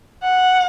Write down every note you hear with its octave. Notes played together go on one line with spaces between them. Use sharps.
F#5